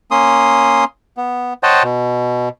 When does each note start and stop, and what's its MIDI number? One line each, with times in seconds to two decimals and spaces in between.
0.11 0.84 58
0.11 0.84 61
0.11 0.84 84
0.11 0.84 87
1.17 1.54 59
1.63 1.83 72
1.63 1.83 73
1.63 1.83 75
1.63 1.83 78
1.63 1.83 79
1.63 1.83 81
1.83 2.49 47